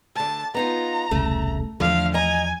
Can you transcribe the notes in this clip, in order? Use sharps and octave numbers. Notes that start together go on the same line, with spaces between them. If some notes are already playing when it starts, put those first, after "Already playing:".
D2 D3 A5
B3 D#4 F4 A#5
E1 C2 C#3 A3
E2 D3 F3 A3 F5
D#5 G#5 A#5